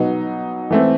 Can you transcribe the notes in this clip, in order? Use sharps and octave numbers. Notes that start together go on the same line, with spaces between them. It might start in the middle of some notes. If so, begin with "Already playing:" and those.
Already playing: B2 F#3 B3 D#4
E3 A3 C4